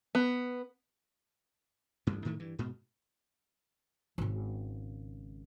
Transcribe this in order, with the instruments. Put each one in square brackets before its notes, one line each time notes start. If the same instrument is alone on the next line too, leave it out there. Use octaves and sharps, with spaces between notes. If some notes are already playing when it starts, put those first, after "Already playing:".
[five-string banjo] B3
[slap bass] A1 D2 G2
A2 D#3 E3 A3
G2 E3
G#2 B2
[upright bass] G#1 C#3